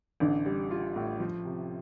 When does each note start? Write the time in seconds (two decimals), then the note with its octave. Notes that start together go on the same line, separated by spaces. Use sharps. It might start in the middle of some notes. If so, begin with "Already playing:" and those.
0.20 A1 D3
0.45 G3
0.71 F4
0.96 A2
1.20 F3
1.45 C3